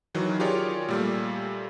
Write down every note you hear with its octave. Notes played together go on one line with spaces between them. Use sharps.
D#3 E3 F#3
F4 G4 G#4 A#4 C#5 D5
A#2 G3 A3